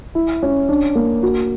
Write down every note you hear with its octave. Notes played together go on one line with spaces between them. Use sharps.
E4
C#4
D4
A#3
F#4